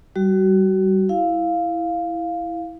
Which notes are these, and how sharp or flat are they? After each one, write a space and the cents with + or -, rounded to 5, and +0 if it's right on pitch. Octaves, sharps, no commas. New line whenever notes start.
G3 -20 F#4 +25
E4 +0 F5 +0